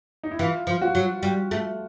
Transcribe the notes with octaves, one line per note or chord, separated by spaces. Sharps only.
D#4
E4
E3 F4
F3
F#4
F#3
G3 F#4
A3